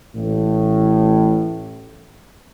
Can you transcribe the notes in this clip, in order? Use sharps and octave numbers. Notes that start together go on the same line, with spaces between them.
A1 A2